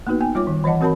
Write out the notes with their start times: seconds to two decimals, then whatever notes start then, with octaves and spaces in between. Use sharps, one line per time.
0.07 A#3 B3 D#4 F#4 B4
0.20 B3 G5 G#5
0.35 G3 F4 C#5 D6
0.47 D#3
0.64 E3 C#5 D#5 F#5 A5
0.81 C4 F#4 A#4 C#5 A5 B5